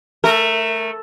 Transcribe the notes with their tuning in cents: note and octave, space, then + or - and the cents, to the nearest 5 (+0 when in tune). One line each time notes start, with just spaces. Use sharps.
A3 +0 A#4 -25